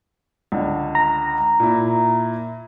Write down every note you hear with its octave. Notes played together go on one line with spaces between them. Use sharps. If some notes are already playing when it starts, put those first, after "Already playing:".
C#2 D3
A#5
A#2 E4